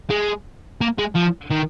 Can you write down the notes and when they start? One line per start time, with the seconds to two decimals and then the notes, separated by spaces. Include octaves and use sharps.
0.10 G#3
0.81 A#3
0.99 G#3
1.15 F3
1.51 D#3